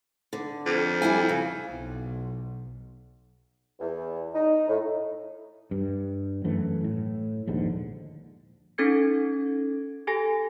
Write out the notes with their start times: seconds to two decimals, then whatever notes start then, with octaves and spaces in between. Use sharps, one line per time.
0.33 D3
0.66 F2
1.02 G3 E4 G#5
1.29 C#3
1.69 B1
3.79 E2
4.34 D#4
4.68 A2
5.71 G2
6.45 F#2 E3 A3
6.84 A2
7.47 A#1 D#2 G#2 D3
8.78 C#4 D#4 A4 G#6 C#7
10.07 G4 A4 G#5 A#6